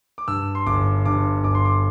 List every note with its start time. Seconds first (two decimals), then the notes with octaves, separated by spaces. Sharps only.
0.18 D6
0.28 G2 E6
0.55 C6
0.66 G1 D6
1.05 G2 D6
1.44 G1 D6
1.55 C6
1.65 D6